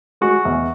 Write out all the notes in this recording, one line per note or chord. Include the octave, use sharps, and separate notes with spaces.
G#3 F#4
E2